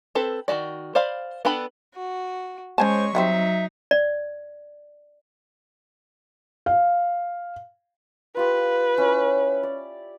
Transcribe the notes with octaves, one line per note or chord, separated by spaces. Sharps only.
C4 A4 B4
D#3 F#3 F#4 D5
C5 D5 F5 B5
B3 D4 A4 G5 B5
F#4
G#3 C#4 C5 C#5 G#5 A5 C#6
D#3 F#3 G3 C4 D#4 E5
D5
F5
F4 G4 B4
C#4 E4 C#5
D5